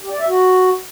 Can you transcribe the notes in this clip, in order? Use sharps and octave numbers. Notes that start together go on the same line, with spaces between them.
G4
D5
E5
F#4